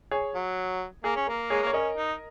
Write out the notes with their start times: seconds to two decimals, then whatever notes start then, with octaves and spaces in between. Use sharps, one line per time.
0.11 G#4 C#5
0.35 F#3
1.04 A#3 G#4
1.16 C#4
1.27 A#3 A#4
1.50 G#3 G#4 C#5
1.62 A#3 C#5
1.73 C#4 A#4 D#5
1.97 D#4